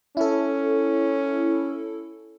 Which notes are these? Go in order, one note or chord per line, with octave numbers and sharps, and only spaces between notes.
C#4 E4 A4